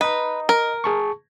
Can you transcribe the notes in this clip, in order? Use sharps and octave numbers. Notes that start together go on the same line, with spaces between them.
B4 D#5 A#5
A#4
G#4 A5 C#6